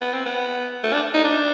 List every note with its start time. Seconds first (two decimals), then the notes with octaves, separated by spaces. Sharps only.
0.01 B3
0.14 C4
0.26 B3
0.84 A3
0.93 D4
1.14 D#4
1.25 D4